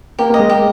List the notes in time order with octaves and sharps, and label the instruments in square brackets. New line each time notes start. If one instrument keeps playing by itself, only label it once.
[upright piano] A#3 [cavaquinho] G4
[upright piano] A#3
[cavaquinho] D#5
[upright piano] G#3
[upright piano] A#3 [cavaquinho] G4